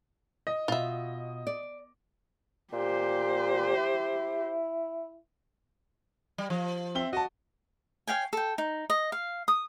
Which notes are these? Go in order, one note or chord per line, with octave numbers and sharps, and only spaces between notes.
D#5
B2 F4 E5
D5
A#2 G4 C5
E4
G3
F3
C4 E5 G7
F#4 D#5 A5
C#5 F5 G5 G#5
A4 G5
D#4
D#5
F5
D#6